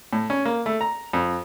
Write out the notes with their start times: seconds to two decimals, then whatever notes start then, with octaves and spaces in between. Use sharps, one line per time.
0.13 A2
0.30 C#4
0.45 A#3
0.66 A3
0.81 A#5
1.13 F2